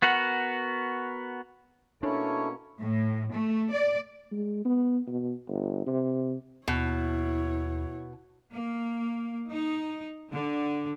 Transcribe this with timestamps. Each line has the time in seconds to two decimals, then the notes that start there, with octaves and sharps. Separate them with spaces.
0.02 B3 F#4 A#4 F#5
2.03 B2 A#3 C#4 D4 E4 A4 C#5
2.82 A2
3.32 A3
3.72 D5
4.32 G#3
4.65 B3
5.07 B2
5.47 G1
5.86 C3
6.68 D#2 B2 E4 C#5
8.53 A#3
9.49 D#4
10.32 D3